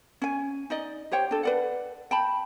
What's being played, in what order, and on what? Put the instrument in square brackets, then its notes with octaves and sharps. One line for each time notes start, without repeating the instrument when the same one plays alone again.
[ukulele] C#4 G#5
D#4 D5 D#5
G4 C5 C#5 G5
D4 A4
B4 D5 F#5
G5 A5 B5